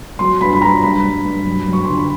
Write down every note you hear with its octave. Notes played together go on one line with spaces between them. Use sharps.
F#3 C6
G2 B5
B5
F#3 A#5
G2 B5
G2
G2
F#2
F#2
C#6
D3 C6
B5